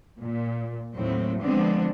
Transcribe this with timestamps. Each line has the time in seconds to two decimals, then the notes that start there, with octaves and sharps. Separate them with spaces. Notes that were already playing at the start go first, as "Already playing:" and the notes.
0.20 A#2
0.95 D#2 A2 F#3 C4
1.42 D3 F3 G#3 B3 C4 D4